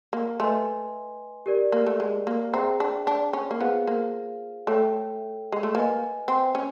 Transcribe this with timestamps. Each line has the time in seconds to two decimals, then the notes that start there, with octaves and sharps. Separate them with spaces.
0.13 A#3
0.40 A3 B4 D#5 G#5 C6
1.46 G4 A#4 D5
1.72 A#3
1.86 A3
2.00 G#3
2.27 A#3
2.53 C4 G#4 C5 E5 G5 A#5
2.80 D4
3.07 D4
3.33 C#4
3.51 A#3
3.60 B3 F4 G#4 C5 F5
3.87 A#3
4.67 A3 A4 C#5 E5 G5
5.52 G#3
5.63 A3
5.74 A#3 B4 D#5 G#5
6.28 C4
6.55 C#4